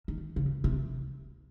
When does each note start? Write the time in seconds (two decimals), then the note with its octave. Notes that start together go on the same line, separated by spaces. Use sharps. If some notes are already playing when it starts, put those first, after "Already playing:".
0.08 D#3
0.36 C#3
0.64 C3